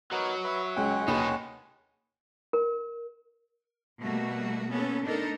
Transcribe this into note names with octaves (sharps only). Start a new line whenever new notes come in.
F#3 B3 D#4 F#4 A#4
B4 E5
E5
C#2 G#3 C#4 F#5 G5
D#2 B2 D#4 B5 E7
A#4
B2 G3 A3 A#3 F#4
A#3 B3 C#4 A4
A3 B3 D4 D#4 A4 A#4